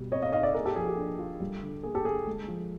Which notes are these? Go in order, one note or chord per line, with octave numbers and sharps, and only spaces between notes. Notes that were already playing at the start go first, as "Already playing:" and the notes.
Already playing: B2 G3
C4 C#5 D#5
D#5 F5
D#4 D#5 F5
D5 E5
A#3 G#4 A#4
G4 A4
F3 G#4
G4
D4
F4
G3
D3
A#3 G#4
G4 A4
D3 G#4
G#3
F3